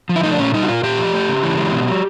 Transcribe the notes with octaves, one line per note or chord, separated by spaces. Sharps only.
F3
E4
A3 D#4
D4
A#2 C#4
G3 D#4
F#4
A#2 F4
A#2 G4
F3
A3
C#3
E3
G#3
B2
F#3